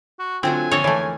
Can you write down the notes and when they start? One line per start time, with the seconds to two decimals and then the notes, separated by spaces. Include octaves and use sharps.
0.19 F#4
0.43 D3 F#3 A3 C4 F4 G#5
0.71 F2 D3 A#3 A4 C#5
0.84 E3 A3 C#5 A5